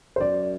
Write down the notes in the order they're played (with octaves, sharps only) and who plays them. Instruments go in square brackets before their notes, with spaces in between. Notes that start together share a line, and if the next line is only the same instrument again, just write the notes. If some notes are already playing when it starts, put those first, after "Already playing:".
[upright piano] C5
[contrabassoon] F#2 [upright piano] D5